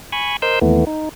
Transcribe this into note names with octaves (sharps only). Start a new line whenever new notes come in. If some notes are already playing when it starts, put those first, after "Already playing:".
G#5 B5 C#6
A#4 C5 D#5 C6 E6 G6
D#2 E3 A3 B3
D#4